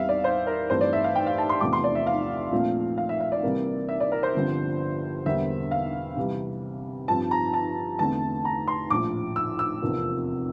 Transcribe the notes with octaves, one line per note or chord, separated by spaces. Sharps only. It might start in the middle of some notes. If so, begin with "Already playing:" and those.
Already playing: E2 E3 G3 C4 E5 F5
D5
C5
A#4
G2 E3 A3 C4 C5
D5
E5
F5
G5
F5
A5
C6
E2 C3 F3 A3 D6
C6
D5
E5
F5
A#1 A#2 F3 A3 C4
F5
E5
E5
D5
C2 C3 E3 G3 A#3
E5
D5
A#4
C5
G1 G2 D3 F3 C4
E1 E2 D3 G3 A#3 E5
F5
C2 C3 E3 G3
G2 F3 C4 A5
A#5
A5
E2 D3 A3 C4 A5
A#5
C6
A#1 A2 F3 D6
E6
E6
F1 E2 C3 F3 A#3